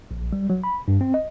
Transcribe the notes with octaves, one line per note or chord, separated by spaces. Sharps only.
A#1
G3
F#3
B5
G2
C4
D#5